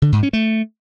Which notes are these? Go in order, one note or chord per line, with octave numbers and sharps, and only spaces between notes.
D3
G#2
C#4
A3